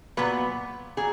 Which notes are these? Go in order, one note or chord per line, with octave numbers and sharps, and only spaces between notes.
A#2 F#3 B3 B4
A#2 F#3 G#4